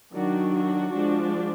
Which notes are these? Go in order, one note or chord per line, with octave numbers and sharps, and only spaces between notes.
D#3 F#3 D4 F#4
F#4
F3 G#3 D4